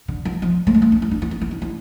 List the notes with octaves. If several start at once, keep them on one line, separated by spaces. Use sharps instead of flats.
D3
F3
F3
A3
G#3
A3
D4
E4
D4
E4
D4
E4
D4
E4